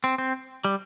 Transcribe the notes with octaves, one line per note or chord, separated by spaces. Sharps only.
C4
C4
G3